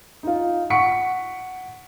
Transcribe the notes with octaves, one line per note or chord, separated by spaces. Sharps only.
D#4 F4
F#5 C#6 B6 C#7 D7